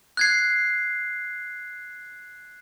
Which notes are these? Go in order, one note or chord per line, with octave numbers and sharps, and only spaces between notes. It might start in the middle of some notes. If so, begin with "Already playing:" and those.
F#6 G#6 C7